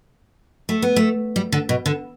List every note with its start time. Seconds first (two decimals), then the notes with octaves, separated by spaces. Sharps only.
0.69 A3
0.82 B3
0.96 A3
1.36 G3
1.52 D3
1.69 B2
1.86 D3